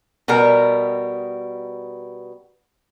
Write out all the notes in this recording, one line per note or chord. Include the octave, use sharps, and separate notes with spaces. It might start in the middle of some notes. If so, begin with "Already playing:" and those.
B2 G3 B3 A#4